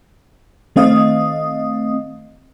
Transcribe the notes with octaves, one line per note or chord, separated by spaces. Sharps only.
D#3 A3 C4 D#5 F5 D#6